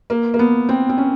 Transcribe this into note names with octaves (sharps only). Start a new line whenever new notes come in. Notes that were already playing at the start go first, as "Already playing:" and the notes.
A#3
A#3
B3
C4
C4
C#4